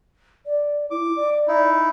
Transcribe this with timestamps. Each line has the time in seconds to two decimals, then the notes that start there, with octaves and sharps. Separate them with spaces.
0.46 D5
0.91 E4 D6
1.17 D5
1.47 D#4 E4